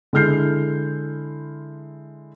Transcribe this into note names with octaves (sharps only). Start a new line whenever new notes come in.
D3 G#3 E4 F6 G6 C7